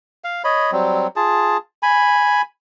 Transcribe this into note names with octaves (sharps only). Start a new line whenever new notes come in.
F5
C#5 D#5 B5
F#3 G3 C4
F4 G#4 A5
G#5 B5